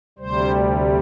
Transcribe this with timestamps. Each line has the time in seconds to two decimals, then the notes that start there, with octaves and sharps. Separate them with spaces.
0.18 D2 C3 G3 C5